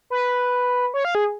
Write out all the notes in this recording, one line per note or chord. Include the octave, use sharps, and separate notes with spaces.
B4
C#5
F5
G#4